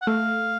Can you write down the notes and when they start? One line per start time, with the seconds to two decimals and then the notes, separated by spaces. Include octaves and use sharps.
0.02 F#5
0.07 A3 F5